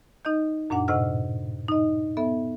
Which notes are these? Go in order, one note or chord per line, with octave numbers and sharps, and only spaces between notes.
D#4 D#5 G6
F#2 A#2 D4 F#5
A2 C3 D#5 F#5 E6 F6
D#4 D#5
B3 A4 E5